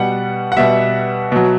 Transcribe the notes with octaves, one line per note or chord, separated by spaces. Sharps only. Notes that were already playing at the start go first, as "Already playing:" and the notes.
Already playing: B2 G3 F#5
F#5
B2 G3 E5
B2 F#3